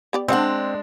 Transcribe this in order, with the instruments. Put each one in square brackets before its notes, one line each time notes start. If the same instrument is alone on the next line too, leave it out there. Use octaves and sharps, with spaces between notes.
[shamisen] B3 G4 D5
[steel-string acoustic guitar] G#3 D4 [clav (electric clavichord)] C4 [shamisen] C5 D#5 F#5